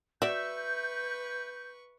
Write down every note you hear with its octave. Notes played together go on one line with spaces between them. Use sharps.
F#4 B4 D5 E5 C#6 G6